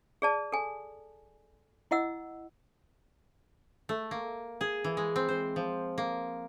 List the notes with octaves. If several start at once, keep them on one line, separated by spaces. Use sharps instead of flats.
G#4 D5 A5
A4 G#5
E4 D#5 F#5 E6
A3
A#3
G#4
E3
G#3
C4
C5
F3
A#3